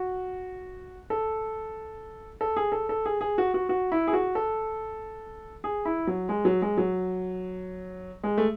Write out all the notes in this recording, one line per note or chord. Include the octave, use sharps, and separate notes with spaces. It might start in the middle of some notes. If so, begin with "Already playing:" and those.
Already playing: F#4
A4
A4
G#4
A4
A4
G#4
G#4
F#4
F#4
F#4
E4
G#4
F#4
A4
G#4
E4
F#3
G#3
F#3
G#3
F#3
G#3
A3